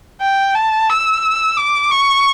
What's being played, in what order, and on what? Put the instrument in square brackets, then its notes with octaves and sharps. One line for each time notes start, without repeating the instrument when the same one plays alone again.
[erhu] G5
A5
E6
D6
C#6